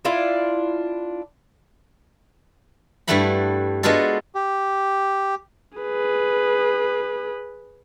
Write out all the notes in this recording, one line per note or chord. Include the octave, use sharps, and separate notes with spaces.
D4 E4 F4 D5
G2 G3 A3 E4 F#5 B5
G#3 B3 D4 F4 F#4 A4
G4
G#4 B4